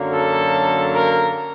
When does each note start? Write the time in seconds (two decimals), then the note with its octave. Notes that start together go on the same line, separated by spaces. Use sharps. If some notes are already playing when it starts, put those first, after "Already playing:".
Already playing: F#2 D3 F#3 A#3
0.12 A4
0.92 A#4